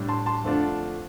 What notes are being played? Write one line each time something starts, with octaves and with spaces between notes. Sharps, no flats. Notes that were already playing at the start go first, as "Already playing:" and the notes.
Already playing: A2 G3 D4
A5 C6
A5 C6
F2 D3 A3 D4 F4